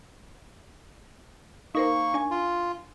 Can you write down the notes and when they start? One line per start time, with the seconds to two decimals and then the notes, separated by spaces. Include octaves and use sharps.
1.75 A#3 D#4 A#4 C5 C#6
2.14 D4 G#5
2.31 F4